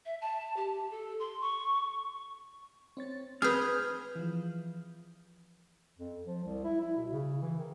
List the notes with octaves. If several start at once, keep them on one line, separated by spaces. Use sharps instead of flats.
E5
A5
G4
A4
C6
C#6
C4 C#5 A6
C4 G#4 B4 F6 G6
E3 F3
F2
F3
C2
E4
E4
B2
C#3
E3
D#3